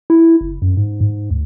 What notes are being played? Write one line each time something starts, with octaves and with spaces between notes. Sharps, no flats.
E4
F#1
F#2
G#2
G#2
D2